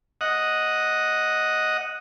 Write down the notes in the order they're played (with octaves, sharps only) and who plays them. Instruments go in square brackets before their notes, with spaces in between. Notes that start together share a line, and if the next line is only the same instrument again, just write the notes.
[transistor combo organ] D#5 F#5